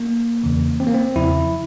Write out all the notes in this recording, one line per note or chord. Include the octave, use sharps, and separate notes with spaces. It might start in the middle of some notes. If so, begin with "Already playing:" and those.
Already playing: A#3
E2 C#3 E3
C4
A#3
C4
E2 C#3 F3 E4